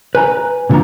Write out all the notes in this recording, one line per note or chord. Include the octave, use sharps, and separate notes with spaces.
B4 G#5 A#5
A#2 D3 F3 G#3 A#3 A#5